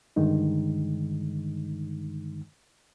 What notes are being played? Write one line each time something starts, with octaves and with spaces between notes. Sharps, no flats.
G2 D3 D#3 G#3 D#4